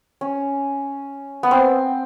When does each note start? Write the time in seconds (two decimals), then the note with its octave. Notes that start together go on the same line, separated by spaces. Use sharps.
0.21 C#4
1.43 B3
1.51 C4